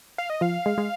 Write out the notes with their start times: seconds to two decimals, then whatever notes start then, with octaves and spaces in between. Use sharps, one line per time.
0.18 F5
0.30 D#5
0.41 F3 F5
0.66 G#3
0.78 G#3